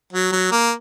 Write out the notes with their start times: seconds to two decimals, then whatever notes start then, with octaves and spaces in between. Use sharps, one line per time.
0.13 F#3
0.32 F#3
0.52 A#3